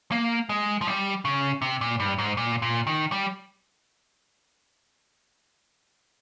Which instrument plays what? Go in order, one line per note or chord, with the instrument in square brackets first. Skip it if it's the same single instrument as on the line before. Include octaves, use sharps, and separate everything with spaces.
[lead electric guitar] A#3
G#3
F3
G3
C#3
C3
A#2
G2
G#2
A#2
A#2
D#3
G3